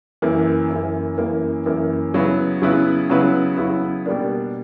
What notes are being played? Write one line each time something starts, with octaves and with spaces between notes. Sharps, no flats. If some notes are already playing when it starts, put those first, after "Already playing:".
F#2 E3 A#3
F#2 E3 A#3
F#2 E3 A#3
F#2 E3 A#3
C#3 F#3 B3 E4 B4
C#3 F#3 B3 E4 B4
C#3 F#3 B3 E4 B4
C#3 F#3 B3 E4 B4
B2 G3 A#3 D4